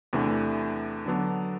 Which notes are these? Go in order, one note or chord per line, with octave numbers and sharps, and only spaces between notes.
E2 C3 E3 A3 D4
D3 F#3 B3 D4